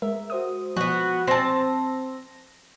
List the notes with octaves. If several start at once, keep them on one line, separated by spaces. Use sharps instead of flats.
G#3 A#4 E5
F#4 C5 D#6
F3 B3 F#4
C4 A5 A#6